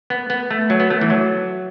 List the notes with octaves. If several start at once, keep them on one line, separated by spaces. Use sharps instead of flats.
B3
B3
A3
F#3
B3
A3
E3
F#3